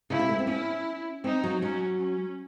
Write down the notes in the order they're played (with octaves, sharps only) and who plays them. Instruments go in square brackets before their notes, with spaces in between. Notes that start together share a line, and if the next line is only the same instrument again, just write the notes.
[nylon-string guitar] C#3 [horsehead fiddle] E4
[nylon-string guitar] C3
A3
C4
[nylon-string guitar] C#4 [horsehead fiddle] E4
[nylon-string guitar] C4 [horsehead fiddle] D#4
[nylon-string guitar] F#3
[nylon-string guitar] F#3 [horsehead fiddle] C#4
[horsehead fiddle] C#4